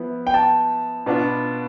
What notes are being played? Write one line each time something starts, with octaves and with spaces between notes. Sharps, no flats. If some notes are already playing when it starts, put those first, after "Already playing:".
Already playing: F3 B3 E4
G5
A5
B2 B3 D4 F4